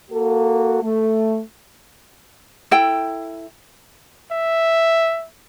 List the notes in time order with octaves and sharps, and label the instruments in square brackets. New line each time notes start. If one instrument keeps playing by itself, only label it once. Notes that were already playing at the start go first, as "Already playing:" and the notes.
[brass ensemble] A#3 F#4 A4
A3
[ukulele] E4 A4 G5
[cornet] E5